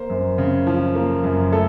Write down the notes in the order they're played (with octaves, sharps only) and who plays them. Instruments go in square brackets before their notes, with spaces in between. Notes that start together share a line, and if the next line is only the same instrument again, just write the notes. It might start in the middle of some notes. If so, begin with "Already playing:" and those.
Already playing: [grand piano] A#3 C5
F#2
C#3
F3
A#3
F#2
A3 A4